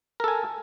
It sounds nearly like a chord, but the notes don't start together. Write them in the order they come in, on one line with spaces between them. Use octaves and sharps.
A#4 A4 G#5